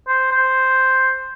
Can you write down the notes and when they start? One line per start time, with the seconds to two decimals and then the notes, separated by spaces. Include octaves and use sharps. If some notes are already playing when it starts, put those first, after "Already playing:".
0.08 C5
0.32 C5